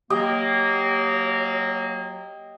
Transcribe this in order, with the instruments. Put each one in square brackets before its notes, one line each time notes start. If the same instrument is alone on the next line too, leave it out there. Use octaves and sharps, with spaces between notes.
[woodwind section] F#3 A#3 [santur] G4 D#5 G5